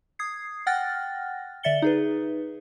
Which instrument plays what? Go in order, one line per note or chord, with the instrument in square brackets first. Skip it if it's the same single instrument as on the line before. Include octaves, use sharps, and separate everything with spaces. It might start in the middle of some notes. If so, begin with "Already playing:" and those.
[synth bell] D#6 G#6 C7
F#5 G5 F6 F#6 A6 A#6
D3 D5 E5 A6 C#7 G7
D#4 G#4 B4